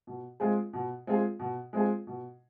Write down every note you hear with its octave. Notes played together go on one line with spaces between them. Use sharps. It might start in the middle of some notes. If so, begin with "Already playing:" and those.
B2
G#3 C4 F4 G#4
B2
G#3 C4 F4 G#4
B2
G#3 C4 F4 G#4
B2